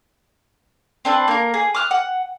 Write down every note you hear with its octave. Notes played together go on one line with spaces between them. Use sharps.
C4 D4 B4
A#3 A#4
G#4
D6 D#6 F6 F#6
F#5